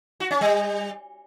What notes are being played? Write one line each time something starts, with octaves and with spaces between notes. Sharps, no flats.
F#4
C#4
G3